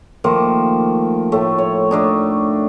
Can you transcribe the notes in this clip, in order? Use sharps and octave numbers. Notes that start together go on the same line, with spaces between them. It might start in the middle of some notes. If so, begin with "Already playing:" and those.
D#3 F3 A3 A#3
A2 A3
C#5
A3 D4 D#4